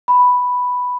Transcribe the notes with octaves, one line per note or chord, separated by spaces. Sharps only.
B5